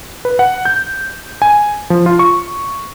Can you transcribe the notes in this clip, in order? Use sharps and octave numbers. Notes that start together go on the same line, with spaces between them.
B4
F#5
G6
G#5
F3
F4
C#6